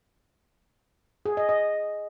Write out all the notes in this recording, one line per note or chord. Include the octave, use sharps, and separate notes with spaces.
G#4
D#5
D#5